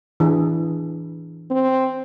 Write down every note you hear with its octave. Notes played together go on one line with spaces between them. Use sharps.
E3 D4 G#4
C4